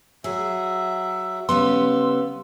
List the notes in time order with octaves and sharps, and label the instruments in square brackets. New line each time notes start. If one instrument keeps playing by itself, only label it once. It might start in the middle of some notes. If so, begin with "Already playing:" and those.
[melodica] F#3 E5 [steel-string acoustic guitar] G#4
[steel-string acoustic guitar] C#3 G3 B3 [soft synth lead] C6 [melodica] E6